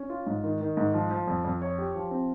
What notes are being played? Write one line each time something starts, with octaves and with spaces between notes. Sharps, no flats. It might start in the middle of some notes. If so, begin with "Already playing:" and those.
Already playing: C#4
F4
G#2
D#3
D#3
G#2
F3
F3
F2
F2
C#5
G4
F3
C4